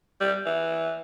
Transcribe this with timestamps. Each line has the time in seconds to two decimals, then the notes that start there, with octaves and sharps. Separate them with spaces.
0.21 G3
0.46 E3